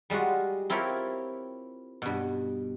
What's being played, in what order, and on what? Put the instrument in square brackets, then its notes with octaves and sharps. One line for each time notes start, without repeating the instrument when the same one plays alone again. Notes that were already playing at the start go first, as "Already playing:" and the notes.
[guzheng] G3 G#3 F4 F#4
C4 E4 F4 G4 A#4 C#5
G2 B2